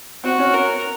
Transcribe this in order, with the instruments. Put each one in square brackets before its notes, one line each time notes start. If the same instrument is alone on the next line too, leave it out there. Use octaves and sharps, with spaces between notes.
[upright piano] C4 [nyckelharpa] F#4
[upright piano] C#4
[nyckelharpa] A#4